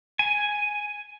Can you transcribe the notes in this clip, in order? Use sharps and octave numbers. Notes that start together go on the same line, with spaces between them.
G#5